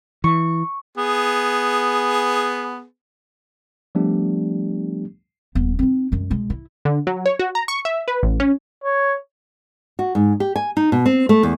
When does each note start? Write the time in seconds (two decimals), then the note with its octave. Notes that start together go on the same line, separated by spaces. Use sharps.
0.24 E3 C#6
0.98 B3 G#4
3.95 F3 G3 A3 B3 D4 G4
5.55 D#1 B3
5.79 C4 D#4
6.12 F#2 G#3
6.30 B2 G#3
6.50 E4
6.85 D3
7.07 F#3
7.26 C#5
7.39 F#4
7.55 A#5
7.68 C#6
7.85 E5
8.08 B4
8.23 A1
8.40 C#4
8.84 C#5
9.99 F#4
10.15 G#2
10.40 G4
10.56 G#5
10.77 D#4
10.92 B2
11.06 C4
11.29 A3
11.43 E2